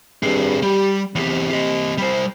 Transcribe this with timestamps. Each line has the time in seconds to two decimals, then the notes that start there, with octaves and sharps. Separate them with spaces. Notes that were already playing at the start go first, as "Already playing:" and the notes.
0.23 G2 C4 G#4
0.63 G3 G4
1.15 E2 C3 G4
1.50 G4 D#5
1.98 G3 C5